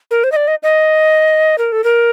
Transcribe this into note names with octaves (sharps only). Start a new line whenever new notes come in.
A#4
C5
D#5
D5
D#5
D#5
A#4
A4
A#4